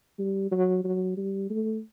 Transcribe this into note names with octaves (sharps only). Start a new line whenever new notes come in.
G3
F#3
F#3
G3
A3